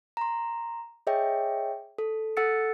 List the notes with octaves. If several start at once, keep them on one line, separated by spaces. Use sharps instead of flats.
A#5 C6
G#4 C#5 D#5 E5 G5
A4
A4 F#5 E6 A6 C#7